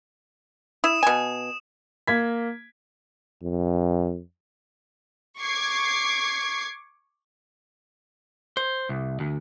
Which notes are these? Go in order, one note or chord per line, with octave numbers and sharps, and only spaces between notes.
E4 D#6 E7
B2 G#5
A#3 G#6 B6
F2
C#6 D6 G#6 C7
C5
C2
D2